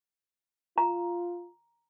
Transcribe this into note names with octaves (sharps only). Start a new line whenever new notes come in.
F4 A#5